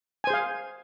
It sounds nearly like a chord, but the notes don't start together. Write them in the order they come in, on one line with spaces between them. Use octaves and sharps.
G#5 C5 G#4 F5